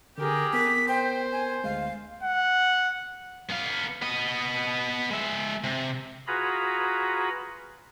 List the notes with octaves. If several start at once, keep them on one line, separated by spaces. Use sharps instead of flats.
D3 G4 G#4 A#4
B3 A#4 B6
C5 G5
G#5
D2 G#3 F5
F#5
B3 F5
B3 D#5
G#3 E5
C3
F4 F#4 G#4 B4 A#5 B5